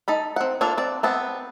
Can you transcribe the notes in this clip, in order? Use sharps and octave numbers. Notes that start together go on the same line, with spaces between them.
D#4 A4 B5
C4 F#5
A#3 D4 F4 A4
C4 D5
B3 C4 A5